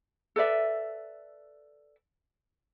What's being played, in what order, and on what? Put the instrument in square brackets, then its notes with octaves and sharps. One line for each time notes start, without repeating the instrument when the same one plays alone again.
[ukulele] A4 B4 D5 E5